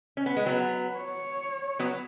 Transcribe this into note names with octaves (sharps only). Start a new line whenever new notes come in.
C#4
B3
G#3
F#3 B3
C#5
F#3 B3